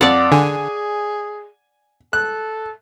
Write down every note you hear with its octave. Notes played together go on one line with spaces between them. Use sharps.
F2 D5 F#5
D3 G#4 G#5
A4 F#6